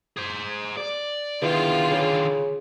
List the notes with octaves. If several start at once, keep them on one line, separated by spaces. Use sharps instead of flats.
G#4 C5
D5
E2 D3 D#3 F4
C#3